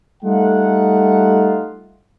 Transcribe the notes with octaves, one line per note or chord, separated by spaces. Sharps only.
G3 A3 D#4 F4 F#5